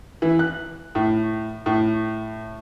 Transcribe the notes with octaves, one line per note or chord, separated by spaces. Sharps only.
E3
F#6
A2
A2